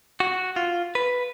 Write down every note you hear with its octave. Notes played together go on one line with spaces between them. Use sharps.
F#4
F4
B4